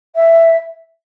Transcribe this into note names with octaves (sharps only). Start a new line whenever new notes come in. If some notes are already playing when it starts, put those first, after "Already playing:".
E5